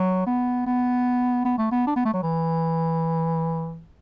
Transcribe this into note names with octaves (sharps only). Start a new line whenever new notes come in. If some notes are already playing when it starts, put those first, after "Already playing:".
Already playing: F#3
B3
B3
B3
A3
B3
D4
B3
A3
F#3
E3